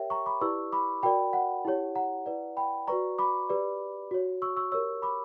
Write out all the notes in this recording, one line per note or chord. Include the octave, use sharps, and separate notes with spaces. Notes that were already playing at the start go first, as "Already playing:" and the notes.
Already playing: G4 A#4 C#5 E5 G5
A#5 C#6
B5 D6
E4 G4 B4 D5 C#6 E6
B5 D6
F#4 A#4 D5 G5 B5
F#5
E4 G4 C#5
F#5 A#5
E4 B4 D5
G5 B5
F#4 B4 D5 A#5 C#6
B5 D6
G4 B4 D5
F#4 C#5
C#6 E6
C#6 E6
G4 A#4 C#5 C#6 E6
B5 D6